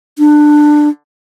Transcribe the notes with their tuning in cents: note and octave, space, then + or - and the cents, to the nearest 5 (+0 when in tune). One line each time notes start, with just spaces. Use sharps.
D4 +20